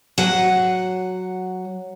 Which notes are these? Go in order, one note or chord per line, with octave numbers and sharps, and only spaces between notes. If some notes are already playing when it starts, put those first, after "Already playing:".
F#3 F#5